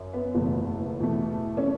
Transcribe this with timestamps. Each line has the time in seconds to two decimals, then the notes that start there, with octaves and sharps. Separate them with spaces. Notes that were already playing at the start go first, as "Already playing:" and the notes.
Already playing: F#2
0.13 B3
0.34 F#1 E2 B2 A3
1.00 E2 B2 A3
1.57 C#4